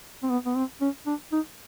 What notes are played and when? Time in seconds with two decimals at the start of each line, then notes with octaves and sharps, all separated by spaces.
0.23 C4
0.30 B3
0.46 B3
0.56 C4
0.81 C#4
1.06 D4
1.32 D#4